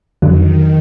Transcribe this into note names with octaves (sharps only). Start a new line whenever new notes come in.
F2 D3 D#3 F#3